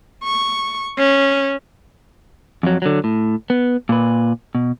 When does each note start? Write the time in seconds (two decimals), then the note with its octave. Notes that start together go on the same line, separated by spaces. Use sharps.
0.23 C#6
0.98 C#4
2.63 F2 F#3
2.82 D3 F#3
3.04 A2
3.50 B3
3.89 A#2 B4
4.55 B2